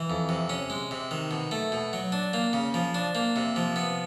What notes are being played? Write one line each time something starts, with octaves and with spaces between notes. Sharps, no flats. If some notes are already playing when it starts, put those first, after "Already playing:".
Already playing: E3
F2
C3
C#4
G#3
C3
D#3
B2
A3
B2
F#3
D4
A#3
C#3
F3
D4
A#3
C3
F3
B3